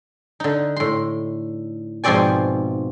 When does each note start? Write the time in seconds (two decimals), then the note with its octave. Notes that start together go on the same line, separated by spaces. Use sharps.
0.40 D3 D#4
0.76 A2 C6
2.04 G#2 B2 F3 C4 D5 G#5